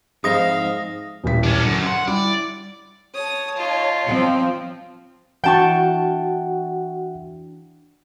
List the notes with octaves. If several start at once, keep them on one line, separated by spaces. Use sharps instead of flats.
F2 G#2 G#3 D#4 E5 F5 D#6 A#6
D#1 A1 B6
C#4 D4
F#2 D3
F#5 C6
G3 E4 D5
C#5 A5 D#6
D#4 F4
F3 C4
E3 D4 F#4 E5 F#5 G5 A5 C#6